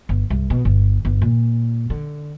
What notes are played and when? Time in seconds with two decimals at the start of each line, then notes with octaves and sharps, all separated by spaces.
0.09 G1
0.30 C2
0.50 B2
0.65 G1
1.05 G1
1.22 A#2
1.90 D3